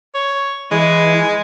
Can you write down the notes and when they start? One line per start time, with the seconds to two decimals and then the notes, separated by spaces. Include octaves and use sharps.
0.14 C#5
0.71 E3 G#3